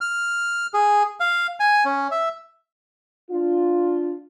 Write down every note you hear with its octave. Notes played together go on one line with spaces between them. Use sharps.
F6
G#4
F5
G#5
C#4
E5
D4 F4